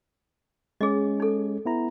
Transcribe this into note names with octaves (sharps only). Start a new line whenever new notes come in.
G#3 C#4 G#4 D#5
D#4 A4
B3 E4 A#5